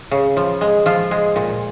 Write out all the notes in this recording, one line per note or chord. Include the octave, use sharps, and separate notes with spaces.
C#3
F3
G#3
F3 F4
G#3
A#2